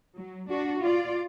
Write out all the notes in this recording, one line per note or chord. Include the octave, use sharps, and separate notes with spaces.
F#3
D4 F#4
F4 D5